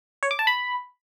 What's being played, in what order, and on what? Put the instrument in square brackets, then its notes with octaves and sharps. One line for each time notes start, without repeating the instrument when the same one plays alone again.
[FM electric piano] C#5
D6
A5
B5